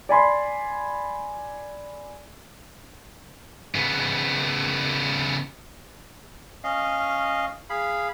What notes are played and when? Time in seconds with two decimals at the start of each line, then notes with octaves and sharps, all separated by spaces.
0.09 D5 G#5 B5 C6
3.75 C#3 B3
6.64 C#4 D#5 F5
7.70 G#4 F5 B5